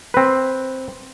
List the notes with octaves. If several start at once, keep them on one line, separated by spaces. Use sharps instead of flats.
C4 B4